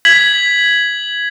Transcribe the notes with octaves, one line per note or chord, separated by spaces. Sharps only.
G#6 B6 F#7